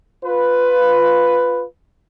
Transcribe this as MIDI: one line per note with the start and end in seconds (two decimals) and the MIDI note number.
0.24 1.65 65
0.24 1.65 71